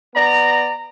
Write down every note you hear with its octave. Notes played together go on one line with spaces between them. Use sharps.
B3 D5 A#5